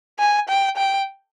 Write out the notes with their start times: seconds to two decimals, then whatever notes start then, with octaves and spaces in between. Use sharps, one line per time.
0.19 G#5
0.49 G5
0.77 G5